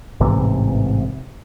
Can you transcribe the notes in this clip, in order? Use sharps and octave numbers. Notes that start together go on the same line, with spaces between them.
A1 G#2 C3 E3